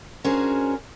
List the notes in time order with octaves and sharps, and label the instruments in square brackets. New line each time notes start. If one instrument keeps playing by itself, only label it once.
[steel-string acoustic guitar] C#4 D4 F#4 G#4 A#4 C5